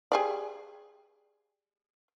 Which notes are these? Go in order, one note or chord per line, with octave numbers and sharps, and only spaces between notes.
G4 G#4 D5